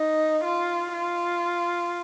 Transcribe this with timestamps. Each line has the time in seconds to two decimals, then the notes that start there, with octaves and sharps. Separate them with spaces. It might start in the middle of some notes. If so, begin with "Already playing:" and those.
Already playing: D#4
0.44 F4
0.93 F4